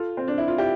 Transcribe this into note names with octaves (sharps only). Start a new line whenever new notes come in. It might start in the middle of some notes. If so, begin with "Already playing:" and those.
Already playing: F4 A4
C4
D4
E4
F4
E4 G4